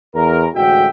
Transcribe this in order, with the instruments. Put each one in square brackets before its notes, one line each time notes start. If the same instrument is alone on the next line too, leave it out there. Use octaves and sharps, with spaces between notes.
[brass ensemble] E2 A#4
A1 D2 G#3 F#4 E5 G5